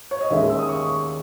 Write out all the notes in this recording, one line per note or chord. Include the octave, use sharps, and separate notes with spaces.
C#5
D#5
D#2 D#3 G#3 C#4 E5
E6
D#6
C#6